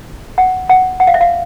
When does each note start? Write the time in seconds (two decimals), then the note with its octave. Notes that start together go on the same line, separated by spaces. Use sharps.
0.38 F#5
0.69 F#5
1.00 F#5
1.07 F5
1.14 E5
1.21 F5